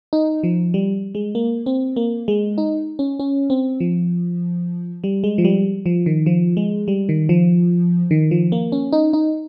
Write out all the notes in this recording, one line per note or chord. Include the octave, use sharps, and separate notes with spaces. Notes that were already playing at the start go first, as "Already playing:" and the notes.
D#4
F3
G3
G#3
A#3
C4
A#3
G#3
D#4
C#4
C#4
C4
F3
G3
G#3
F3
G3
F3
D#3
F3
G#3
G3
D#3
F3
D#3
F3
A#3
C#4
D#4
D#4